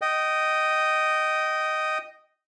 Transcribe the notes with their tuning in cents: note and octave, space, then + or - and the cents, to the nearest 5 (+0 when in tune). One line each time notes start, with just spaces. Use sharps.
D#5 +0 G5 -25